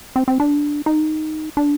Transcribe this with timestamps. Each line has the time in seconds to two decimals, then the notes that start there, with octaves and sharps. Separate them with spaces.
0.16 C4
0.28 C4
0.40 D4
0.86 D#4
1.57 D4